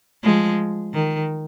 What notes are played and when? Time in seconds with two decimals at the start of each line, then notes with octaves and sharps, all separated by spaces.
0.23 F3 G#3
0.94 D#3